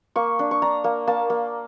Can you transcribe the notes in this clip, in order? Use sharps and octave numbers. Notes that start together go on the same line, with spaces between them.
A#3 C#6
D4
C#6
D4 A#5
A#3
A#3 A5
A#3